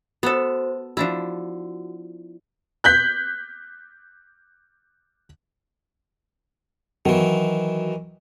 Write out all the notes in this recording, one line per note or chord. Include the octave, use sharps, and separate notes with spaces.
B3 F#4 A4 C5
F3 D4 E4 F#4
F#6 G6 B6
D#3 E3 F#3